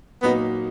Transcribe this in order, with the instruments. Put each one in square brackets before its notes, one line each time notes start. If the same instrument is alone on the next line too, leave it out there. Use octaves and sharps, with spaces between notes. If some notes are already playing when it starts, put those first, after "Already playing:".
[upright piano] A#2 F#3 A#3 D#4 [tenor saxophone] B3